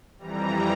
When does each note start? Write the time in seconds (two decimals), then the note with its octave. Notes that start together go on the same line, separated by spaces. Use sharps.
0.18 F2 E3 G3 A#5